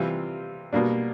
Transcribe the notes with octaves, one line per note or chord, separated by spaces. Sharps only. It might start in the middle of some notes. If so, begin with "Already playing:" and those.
Already playing: C3 E3 G3 C4 F4
B2 G3 A#3 D4